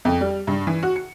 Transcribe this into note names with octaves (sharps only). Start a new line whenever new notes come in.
F2
G3
G2
E3
F#4
C#7